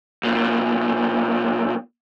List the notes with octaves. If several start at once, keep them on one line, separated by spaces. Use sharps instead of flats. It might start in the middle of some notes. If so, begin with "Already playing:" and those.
B1 A#2